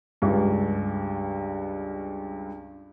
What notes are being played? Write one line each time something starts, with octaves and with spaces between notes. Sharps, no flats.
C#2 G2